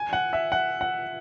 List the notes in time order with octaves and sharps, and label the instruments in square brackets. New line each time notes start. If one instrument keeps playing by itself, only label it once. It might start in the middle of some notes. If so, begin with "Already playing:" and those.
Already playing: [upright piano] G#5
F#5
E5
F#5
F#5